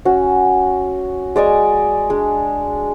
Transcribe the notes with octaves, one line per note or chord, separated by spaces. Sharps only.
C#4 F#4
G#3 D5 D#5 C#6
G#3 D4